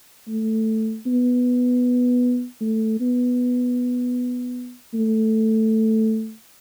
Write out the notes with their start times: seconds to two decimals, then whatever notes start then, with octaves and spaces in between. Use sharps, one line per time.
0.28 A3
1.06 B3
2.61 A3
3.00 B3
4.94 A3